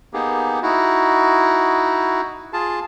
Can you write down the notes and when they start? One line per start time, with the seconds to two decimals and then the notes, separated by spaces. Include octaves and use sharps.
0.13 A#3 B3 D#4 G4 G#4
0.63 D#4 E4 F#4
2.53 F4 G#4 A5